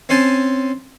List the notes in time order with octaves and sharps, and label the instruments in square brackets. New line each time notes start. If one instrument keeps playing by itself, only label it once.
[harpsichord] C4 C#4 C5 G#5 A5